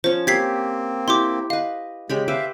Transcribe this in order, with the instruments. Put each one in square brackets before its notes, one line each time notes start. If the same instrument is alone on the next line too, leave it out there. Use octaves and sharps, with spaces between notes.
[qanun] F3 C#4 [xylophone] C5
[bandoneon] A#3 C4 [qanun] G4 [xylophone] G#6 B6 C7
[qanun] E4 G4 [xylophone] C6 D6
[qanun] B4 D#5 [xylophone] F5
[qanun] C#3 G4 B5 [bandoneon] G#3
[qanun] B4 C5 D6 [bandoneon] E5 F5